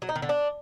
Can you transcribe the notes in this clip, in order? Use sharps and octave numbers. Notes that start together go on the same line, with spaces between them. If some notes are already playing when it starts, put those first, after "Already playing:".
F#3
D#4
D#3
D3
D4